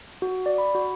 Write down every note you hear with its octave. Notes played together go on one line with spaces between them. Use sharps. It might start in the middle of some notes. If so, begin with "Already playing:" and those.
F#4
D5
B5
F#4